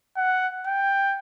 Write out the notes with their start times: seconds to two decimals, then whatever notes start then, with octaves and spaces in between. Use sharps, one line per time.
0.17 F#5
0.67 G5